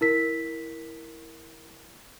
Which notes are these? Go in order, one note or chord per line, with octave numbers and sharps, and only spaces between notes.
E4 A#4 B6